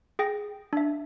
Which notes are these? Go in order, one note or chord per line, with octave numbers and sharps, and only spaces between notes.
G#4 G5 A#6
D4 E5